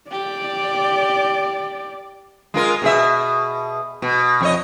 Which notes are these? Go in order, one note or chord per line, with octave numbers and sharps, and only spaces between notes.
G4 D5
G#3 F4 A#4
B2 G#4 E5
B2
F2 C#5 D#5